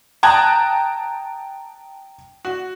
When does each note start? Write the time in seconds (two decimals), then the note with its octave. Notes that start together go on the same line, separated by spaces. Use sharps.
0.23 G5 A5 A#5 D#6 F#6 G#6
2.45 F#4